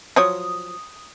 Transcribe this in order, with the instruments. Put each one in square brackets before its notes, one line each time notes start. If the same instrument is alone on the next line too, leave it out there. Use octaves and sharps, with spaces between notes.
[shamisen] F3 F#3 C#5 [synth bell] D#6